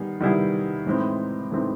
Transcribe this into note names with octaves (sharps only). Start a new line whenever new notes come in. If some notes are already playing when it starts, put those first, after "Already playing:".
Already playing: D#3 G3 B3 G#4
D#3 G3 B3 E4 G#4
A2 E3 G#3 C4 D#4
A2 E3 G#3 C4 D#4